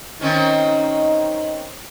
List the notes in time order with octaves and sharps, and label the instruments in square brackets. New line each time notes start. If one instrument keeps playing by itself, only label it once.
[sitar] D#3 C4 C#4 [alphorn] D#4